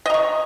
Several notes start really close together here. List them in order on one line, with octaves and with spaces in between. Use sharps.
D#5 A#5 C#6